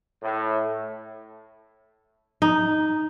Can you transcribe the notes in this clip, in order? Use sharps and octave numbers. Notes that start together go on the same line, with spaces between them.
A2
D#4